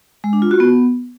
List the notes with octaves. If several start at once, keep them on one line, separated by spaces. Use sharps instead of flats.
G#3
D4
F4
F#4
B3